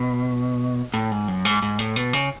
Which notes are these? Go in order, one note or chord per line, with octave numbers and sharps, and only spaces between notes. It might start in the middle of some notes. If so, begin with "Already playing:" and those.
Already playing: B2
A2
G#2
F#2
G#2
G#2
A2
B2
C#3